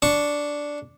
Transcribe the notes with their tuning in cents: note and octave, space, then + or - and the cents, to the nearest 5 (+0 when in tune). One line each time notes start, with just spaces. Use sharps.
D4 -5 C#6 +0